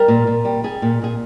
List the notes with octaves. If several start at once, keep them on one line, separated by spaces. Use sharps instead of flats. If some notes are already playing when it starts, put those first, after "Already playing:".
Already playing: G3 A#4
A#2
A#2
G3
G3 G#4
A#2
A#2 G#4